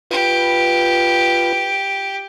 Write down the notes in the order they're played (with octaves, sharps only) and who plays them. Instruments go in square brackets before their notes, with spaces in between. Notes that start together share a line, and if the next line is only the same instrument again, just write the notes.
[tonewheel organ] F4 B4 [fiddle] G4